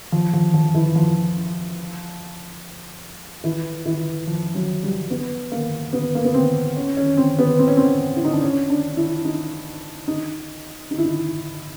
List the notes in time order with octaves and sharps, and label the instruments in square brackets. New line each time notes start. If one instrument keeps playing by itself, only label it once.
[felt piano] F3
F3
F3
E3
F3
E3
E3
F3
F#3
G3
B3
A#3
B3
A#3
B3
C4
C#4
C#4
C4
B3
C4
C#4
C4
E4
D#4
D4
C#4
D4
E4
D#4
D#4
D#4
E4
D#4